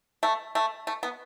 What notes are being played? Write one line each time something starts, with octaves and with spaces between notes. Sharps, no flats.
A3
A3
A3
B3